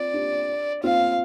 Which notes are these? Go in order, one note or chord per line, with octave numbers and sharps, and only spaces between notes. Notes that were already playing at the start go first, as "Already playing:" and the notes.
Already playing: C4 F4 D5
D4 G4
C4 F4 F5